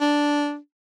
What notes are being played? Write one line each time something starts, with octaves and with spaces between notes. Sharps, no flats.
D4